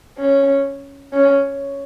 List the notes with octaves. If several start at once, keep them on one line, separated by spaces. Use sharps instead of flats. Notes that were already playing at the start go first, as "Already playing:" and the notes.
C#4
C#4